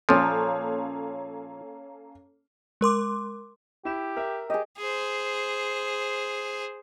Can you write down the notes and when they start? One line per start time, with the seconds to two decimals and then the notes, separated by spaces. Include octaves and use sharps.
0.09 A#2 F3 A#3 C#4 A4
2.81 G#3 A#4 C6 D6
3.85 E4 G4 E7
4.17 A#4 E5
4.50 G4 G#4 D#5
4.77 G#4 C5